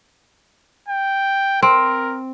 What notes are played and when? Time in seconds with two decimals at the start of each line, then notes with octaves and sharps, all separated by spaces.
0.88 G5
1.63 C4 A#4